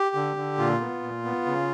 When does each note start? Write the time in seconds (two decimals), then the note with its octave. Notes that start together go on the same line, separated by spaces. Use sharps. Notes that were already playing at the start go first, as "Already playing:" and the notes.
Already playing: G4
0.15 D3
0.37 D3
0.58 A#2 F4
0.81 B3
1.02 A#2
1.25 B3
1.46 C#3